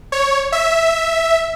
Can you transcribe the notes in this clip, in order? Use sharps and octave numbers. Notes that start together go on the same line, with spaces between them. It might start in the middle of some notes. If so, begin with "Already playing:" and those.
C#5
E5